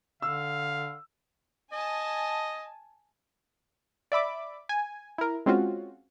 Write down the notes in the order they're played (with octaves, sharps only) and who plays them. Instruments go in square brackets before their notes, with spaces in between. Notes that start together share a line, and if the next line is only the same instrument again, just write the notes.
[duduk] D3 [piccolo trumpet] F5 [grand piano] E6
[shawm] D#5 [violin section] G#5 A5
[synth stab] D5 E5 B5 D6
G#5
E4 A#4
G#3 C4 C#4 F4 F#4